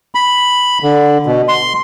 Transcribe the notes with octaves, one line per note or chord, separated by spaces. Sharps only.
B5
D3
B2
C6